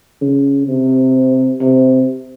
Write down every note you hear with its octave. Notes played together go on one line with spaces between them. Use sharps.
C#3
C3
C3